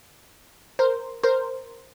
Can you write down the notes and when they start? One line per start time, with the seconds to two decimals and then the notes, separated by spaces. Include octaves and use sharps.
0.79 A#4 C5
1.23 A#4 C5